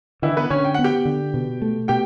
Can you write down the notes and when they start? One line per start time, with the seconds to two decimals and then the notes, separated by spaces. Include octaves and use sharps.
0.22 D3 E3 E4
0.37 B3 B4
0.50 D3 C#4 C#5
0.64 G5
0.74 B3 F#5
0.84 G4 G5
1.05 D3
1.34 B2
1.62 A3
1.88 B2 G4 G5